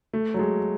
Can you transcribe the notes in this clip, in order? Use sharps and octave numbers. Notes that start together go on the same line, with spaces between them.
A3
F#3
G#3